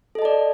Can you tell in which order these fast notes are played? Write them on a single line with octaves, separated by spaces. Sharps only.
A4 D#5 A5 D5